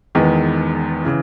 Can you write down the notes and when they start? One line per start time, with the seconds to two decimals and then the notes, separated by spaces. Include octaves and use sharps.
0.15 E1 E2 D#3 G#3 B3
1.05 C#3 E3